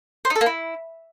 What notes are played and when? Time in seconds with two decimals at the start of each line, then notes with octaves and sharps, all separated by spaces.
0.25 C5
0.30 D#4
0.35 A4
0.41 A#3
0.46 E4